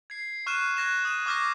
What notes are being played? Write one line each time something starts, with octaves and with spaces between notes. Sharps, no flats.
G#6 C7
C#6 F6 F#6 D#7 E7
F#6 G#6 A#6 E7
D#6 D#7 E7
C#6 D6 F6 G6 A#6